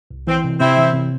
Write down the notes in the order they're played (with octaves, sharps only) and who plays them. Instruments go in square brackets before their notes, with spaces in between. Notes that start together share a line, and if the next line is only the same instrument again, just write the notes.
[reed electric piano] C2
[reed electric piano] E3 [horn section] C4
[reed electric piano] C3
[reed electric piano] C3 [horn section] C4 E4
[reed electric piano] E3
C3